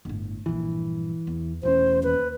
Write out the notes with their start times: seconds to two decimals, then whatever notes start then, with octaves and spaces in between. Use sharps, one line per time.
0.05 G1 A2
0.46 A#1 G2 E3
1.27 E2
1.63 E1 E2 A3 C#4 C5
2.03 D#2 B4